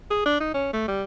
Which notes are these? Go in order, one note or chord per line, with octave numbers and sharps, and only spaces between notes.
G#4
D4
D#4
C#4
A3
G3